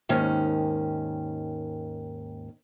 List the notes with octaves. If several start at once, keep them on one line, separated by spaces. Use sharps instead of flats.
D#2 G#2 D#3 C#4